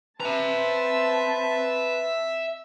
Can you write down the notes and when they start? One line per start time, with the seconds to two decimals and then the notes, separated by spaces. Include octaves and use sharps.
0.20 C4 B4 E5 A5 A#5